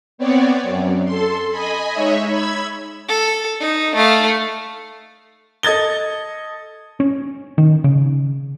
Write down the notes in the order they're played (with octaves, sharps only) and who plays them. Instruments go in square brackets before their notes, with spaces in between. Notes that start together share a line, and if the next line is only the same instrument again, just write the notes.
[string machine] B3 C4 C#5 D5
F#2
A4 C6
D#5 G#5 B5
G#3 D#4 C#5 E5
B5 E6 G#6
[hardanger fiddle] A4
D#4
A3 F5
[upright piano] A4 D#5 G#6 A6 G7
[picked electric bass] C#4
D#3
C#3